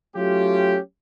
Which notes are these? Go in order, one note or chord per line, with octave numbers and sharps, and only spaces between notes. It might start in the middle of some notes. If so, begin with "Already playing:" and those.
F#3 A3 C#4 F4 G4